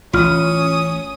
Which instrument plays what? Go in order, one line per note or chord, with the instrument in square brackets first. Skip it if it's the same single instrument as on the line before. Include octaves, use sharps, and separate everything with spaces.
[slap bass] A1 [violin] C#4 D#6 [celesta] F4 F6